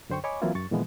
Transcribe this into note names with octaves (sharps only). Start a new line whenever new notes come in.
F#2 D3 C5 G5 C#6
C#5 D#5 G#5 B5 C#6 D6
E3 F#3 A#3 C4 E4 F4
F#2 C#6 A6
A#2 D3 E3 F3 G#3 B3